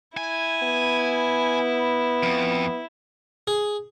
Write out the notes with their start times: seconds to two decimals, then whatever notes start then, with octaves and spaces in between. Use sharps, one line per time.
0.17 E4 G#5
0.63 B3
2.23 F2
3.47 G#4